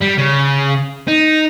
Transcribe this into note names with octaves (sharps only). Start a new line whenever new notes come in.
G3
C#3
D#4